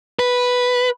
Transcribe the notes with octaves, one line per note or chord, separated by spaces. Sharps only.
B4